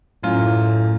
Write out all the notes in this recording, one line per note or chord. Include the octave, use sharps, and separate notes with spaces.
F#2 A2 F4